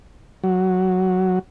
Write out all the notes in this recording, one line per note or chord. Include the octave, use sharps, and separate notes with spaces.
F#3